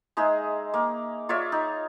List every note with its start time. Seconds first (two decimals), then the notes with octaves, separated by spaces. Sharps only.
0.17 G#3 D#4 G#4 E5
0.74 A#3
1.29 F4 C#5 D5 E5
1.52 D#4